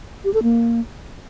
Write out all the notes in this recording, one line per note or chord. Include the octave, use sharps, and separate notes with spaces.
G4
A4
A#3